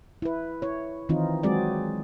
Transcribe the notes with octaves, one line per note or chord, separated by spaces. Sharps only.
E4 B4
E4 C#5
D#3 E3 C4 D#4 F4
F#3 G#3 C4 F#4 G#4 D5